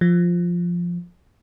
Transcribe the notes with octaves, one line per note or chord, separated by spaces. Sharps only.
F3